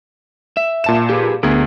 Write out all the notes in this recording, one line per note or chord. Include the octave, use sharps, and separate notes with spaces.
E5
A#2 A5 E7
G4 G#4 B4
D2 B3 G#4 A#4